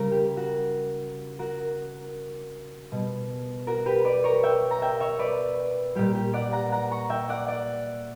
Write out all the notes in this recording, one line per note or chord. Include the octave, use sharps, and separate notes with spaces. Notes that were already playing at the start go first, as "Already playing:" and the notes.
Already playing: C#3 G3 A#4
G4
F#4
F#4 A#4
B2 G3
F#4 A#4
G4 B4
B4 D5
A#4 C#5
E5 G5
A#5
E5 G5
C#5 E5
B4 D5
A#2 G3 G4
G4
D5 F#5
F#5 A#5
F#5 A#5
A#5 C#6
E5 G5
D5 F#5
D5 F#5